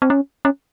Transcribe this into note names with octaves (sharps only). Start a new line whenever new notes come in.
C4
C#4
C#4